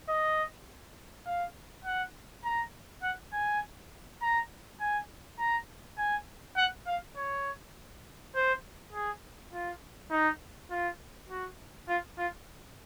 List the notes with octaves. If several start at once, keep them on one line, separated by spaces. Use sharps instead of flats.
D#5
F5
F#5
A#5
F#5
G#5
A#5
G#5
A#5
G#5
F#5
F5
C#5
C5
G#4
F4
D#4
F4
F#4
F4
F4